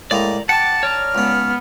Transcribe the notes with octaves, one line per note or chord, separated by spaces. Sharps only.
A2 G#3 A#3 D5 A#5
F#5 G5 A5 D6
C#5 D5 A#5 F6
C#2 B3 C#4